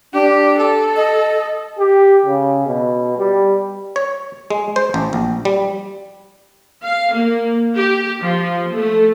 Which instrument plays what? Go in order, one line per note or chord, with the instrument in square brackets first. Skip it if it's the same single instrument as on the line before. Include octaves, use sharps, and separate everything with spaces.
[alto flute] D4 [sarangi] G4
[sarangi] A4
[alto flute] D#5
[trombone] G4
C#3
B2
G3
[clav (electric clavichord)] C#5
G#3
C5
A1
A#1
G3
[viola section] F5
A#3
G4
F3
A3